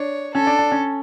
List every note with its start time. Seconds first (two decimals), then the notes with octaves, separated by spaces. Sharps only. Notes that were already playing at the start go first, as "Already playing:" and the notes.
Already playing: D4 C#5
0.34 C#4 A4
0.47 D4
0.59 D4
0.72 C#4